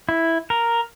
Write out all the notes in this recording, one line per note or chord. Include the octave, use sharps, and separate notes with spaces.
E4
A#4